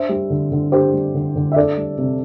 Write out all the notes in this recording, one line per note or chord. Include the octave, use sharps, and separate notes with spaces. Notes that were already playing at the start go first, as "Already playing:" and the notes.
Already playing: D4 C5 E5
G3
D3
D3
D4 G4 C5
G3
D3
D3
E5
D4 A4 D5
G3
C3